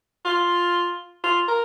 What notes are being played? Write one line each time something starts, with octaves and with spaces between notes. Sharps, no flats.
F4
F4
A#4